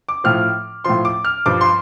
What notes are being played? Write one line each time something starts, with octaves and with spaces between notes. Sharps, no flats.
D6
A2 F3 F6
A2 F3 C6
D6
F6
G2 F3 D6
C6